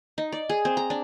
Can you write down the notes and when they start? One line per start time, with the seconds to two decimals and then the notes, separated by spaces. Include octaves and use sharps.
0.18 D#4
0.32 D5
0.49 G#4
0.65 C4
0.77 A#5
0.90 D4